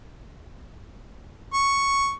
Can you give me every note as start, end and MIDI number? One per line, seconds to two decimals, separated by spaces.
1.54 2.13 85